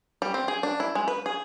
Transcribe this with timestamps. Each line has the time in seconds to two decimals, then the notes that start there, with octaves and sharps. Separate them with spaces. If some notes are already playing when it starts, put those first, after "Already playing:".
0.22 G3
0.34 C4
0.48 G#4
0.63 D4
0.80 E4
0.95 G#3
1.08 B4
1.26 G#4